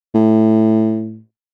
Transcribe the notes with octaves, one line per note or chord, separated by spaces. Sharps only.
A2